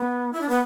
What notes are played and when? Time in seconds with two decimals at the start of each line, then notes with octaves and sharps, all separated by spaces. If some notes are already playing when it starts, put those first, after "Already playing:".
Already playing: B3
0.33 E4
0.41 D4
0.49 B3